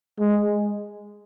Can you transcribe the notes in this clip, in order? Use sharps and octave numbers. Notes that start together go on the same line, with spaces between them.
G#3